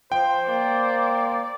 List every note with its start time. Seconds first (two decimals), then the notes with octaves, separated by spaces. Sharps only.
0.12 F3 C5 G5
0.49 A#3 D5